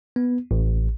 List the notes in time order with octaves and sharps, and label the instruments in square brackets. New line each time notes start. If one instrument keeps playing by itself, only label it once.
[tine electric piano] B3
A1